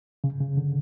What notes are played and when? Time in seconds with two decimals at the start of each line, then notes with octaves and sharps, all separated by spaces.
0.24 C#3
0.41 C#3
0.57 D3